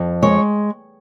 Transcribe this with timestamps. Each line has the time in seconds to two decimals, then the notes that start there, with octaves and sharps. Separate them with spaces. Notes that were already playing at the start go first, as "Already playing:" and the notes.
Already playing: F2
0.22 G#3 C#5